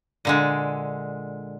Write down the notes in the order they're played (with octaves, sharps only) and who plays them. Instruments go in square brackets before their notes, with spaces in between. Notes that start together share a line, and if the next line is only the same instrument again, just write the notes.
[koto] A#2 D3 G#3